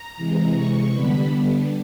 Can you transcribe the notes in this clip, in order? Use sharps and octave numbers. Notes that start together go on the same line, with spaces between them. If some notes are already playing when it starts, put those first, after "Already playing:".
Already playing: A#5
C3 E3 G#3
C#6
D3 G3 B3 D4 B5